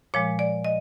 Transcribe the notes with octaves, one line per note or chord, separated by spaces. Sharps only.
A#2 F3 G#3 C#5
D5
D#5